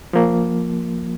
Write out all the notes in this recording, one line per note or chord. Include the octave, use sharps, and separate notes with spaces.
F3 A#3